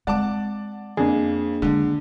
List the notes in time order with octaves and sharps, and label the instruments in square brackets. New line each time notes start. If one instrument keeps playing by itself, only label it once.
[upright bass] G#3 C4 [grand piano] D5 A5 D6 [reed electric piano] F#5
[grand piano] F2 [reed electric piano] A#3 D4 G#4
[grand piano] D3 [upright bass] D#3 G#3